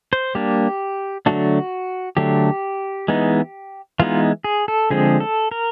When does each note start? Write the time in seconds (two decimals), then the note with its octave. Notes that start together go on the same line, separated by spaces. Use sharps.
0.13 C5
0.35 G3 A#3 D4 G4
1.26 D3 F#3 A3 D4 F#4
2.17 D3 F#3 A3 D4 G4
3.08 E3 G#3 B3 D#4
3.99 E3 G#3 B3 D#4 F4
4.44 G#4
4.68 A4
4.90 D3 F3 G#3 C4 G#4
5.20 A4
5.51 A#4